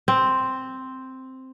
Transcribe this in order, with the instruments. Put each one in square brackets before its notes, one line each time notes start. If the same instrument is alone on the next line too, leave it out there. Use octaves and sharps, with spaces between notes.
[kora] C4